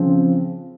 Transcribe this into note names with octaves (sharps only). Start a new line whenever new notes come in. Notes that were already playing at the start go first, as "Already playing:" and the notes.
Already playing: C#3 F3 C4